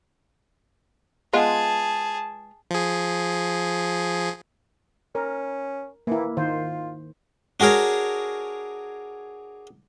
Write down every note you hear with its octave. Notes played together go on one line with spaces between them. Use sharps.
G#3 B3 F4 G#4 A5
F3 G#4
C#4 A#4
E3 A#3 E4
D#3 F4 C5
D4 F#4 G#4 A#4 C#5